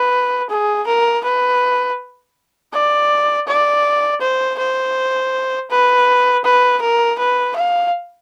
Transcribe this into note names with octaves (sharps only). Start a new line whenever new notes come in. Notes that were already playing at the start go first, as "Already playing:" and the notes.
Already playing: B4
G#4
A#4
B4
D5
D5
C5
C5
B4
B4
A#4
B4
F5